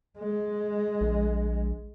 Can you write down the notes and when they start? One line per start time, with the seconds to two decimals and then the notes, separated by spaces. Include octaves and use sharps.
0.19 G#3
1.01 A#1